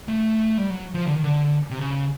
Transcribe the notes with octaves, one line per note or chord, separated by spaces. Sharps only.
A3
G3
F#3
F3
D3
D#3
D3
C3
C#3